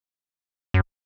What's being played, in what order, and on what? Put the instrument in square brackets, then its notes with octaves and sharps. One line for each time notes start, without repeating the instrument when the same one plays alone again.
[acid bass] F#2